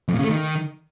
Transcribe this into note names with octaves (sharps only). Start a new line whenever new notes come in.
F2
A#2
C#3
A3
D#3